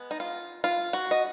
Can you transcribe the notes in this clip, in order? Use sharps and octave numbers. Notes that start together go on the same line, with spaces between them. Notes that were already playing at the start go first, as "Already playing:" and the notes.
Already playing: G#3 B3
D#4
F4
F4
F#4
D#5